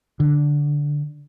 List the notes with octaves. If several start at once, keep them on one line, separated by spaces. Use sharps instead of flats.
D3